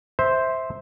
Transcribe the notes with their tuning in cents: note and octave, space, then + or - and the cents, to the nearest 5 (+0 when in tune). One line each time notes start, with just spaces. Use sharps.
C5 +0 E5 -15